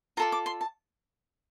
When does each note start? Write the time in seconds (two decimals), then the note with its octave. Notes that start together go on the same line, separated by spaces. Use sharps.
0.17 F4 A4 D5 A#5
0.32 D6
0.46 C6
0.61 A5